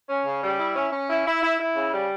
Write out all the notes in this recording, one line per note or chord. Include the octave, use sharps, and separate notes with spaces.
C#4
C#3
G3
E4
C#4
C#4
E4
E4
E4
E4
C#3
G3